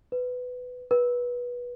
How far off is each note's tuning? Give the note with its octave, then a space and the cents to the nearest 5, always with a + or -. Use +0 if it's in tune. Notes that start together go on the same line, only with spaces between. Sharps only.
B4 +15
B4 -20